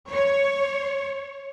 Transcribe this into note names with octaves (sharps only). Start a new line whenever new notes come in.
C#5